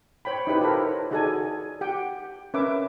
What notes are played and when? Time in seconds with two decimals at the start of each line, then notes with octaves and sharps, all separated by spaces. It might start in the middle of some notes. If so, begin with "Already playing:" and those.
0.25 C5 C#5 G5 B5
0.47 D#4 E4 G4 B4
0.61 F4 G4 A4 A#4 C5 C#5
1.11 D#4 F#4 G#4 A4 D5 G#5
1.81 G4 F#5 G5
2.54 C#4 A#4 B4 E5 D6